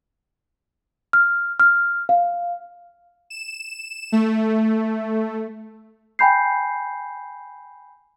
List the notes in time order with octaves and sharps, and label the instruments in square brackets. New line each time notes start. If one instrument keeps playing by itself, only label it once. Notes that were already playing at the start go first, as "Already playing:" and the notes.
[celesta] F6
F6
F5
[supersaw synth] E7
A3
[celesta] G5 G#5 B5 G6 C7